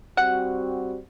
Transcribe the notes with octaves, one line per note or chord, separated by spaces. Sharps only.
G3 C4 F#4 F#5